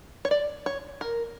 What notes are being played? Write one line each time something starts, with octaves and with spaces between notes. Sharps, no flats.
C#5
D5
C#5
A#4